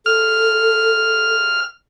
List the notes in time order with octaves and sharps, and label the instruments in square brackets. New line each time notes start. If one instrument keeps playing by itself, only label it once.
[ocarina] A4 [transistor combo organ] F6